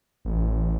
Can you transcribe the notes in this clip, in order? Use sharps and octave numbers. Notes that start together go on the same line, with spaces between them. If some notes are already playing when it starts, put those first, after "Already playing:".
A1